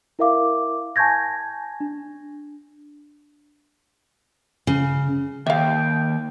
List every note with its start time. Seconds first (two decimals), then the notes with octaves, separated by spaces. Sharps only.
0.19 E4 A#4 E5 F5 D6
0.96 G#5 A5 C#6 G6 G#6 A#6
1.80 D4
4.67 C#3
5.47 D#2 E5 F5 G5